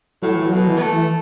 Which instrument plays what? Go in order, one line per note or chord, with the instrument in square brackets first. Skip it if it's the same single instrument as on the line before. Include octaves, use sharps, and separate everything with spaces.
[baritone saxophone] A2 [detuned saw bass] F#3
[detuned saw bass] E3
F#3
[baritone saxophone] B2
[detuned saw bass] E3
[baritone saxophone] B3
A3